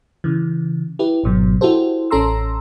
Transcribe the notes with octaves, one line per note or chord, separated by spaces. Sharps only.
C#3 E3
E4 G4 B4
G#1 B2 F#3
E4 F#4 G4 A4 C5
A1 C#4 A4 A#5 C6 E6